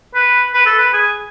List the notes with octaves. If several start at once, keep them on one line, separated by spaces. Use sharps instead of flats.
B4
B4
A4
B4
G#4